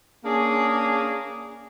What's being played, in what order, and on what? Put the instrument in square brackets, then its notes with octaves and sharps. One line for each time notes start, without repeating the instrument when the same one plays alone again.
[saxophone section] A#3 C#4 D4 G#4